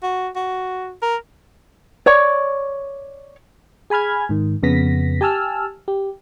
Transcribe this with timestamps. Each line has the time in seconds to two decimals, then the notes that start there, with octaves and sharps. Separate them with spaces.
0.03 F#4
0.36 F#4
1.02 A#4
2.06 C#5 D5
3.90 G#4 G#5 B5 F6 G#6
4.29 G#2 D#3
4.63 F2 C#3 B3 A#6 B6
5.21 G4 G#5 A5 E6 F6
5.88 G4